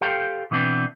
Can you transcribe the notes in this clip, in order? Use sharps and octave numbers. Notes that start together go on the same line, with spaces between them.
G4 A4 C5 F5 G5
B2 E3 B3 C4 D4